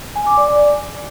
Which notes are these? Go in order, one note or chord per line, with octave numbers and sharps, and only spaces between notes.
G#5
D6
D5
D5